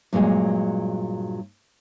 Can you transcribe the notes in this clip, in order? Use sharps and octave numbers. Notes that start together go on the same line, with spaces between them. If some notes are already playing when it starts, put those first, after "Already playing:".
G2 A#2 F#3 G#3